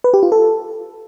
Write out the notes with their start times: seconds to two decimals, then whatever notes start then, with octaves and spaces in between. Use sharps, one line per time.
0.04 B4
0.14 G4
0.23 F4
0.32 A4